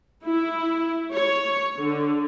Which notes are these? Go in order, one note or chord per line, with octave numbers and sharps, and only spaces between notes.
E4
C#5
D3